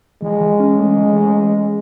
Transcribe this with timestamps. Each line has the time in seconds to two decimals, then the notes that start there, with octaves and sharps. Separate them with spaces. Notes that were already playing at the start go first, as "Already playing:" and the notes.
0.22 E3 G#3
0.41 E3
0.60 C#4
0.79 A3
0.98 E3
1.17 C#4